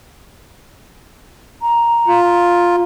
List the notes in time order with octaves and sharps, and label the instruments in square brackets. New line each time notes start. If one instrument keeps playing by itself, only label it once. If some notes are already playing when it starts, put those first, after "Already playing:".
[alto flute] A#5
[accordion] F4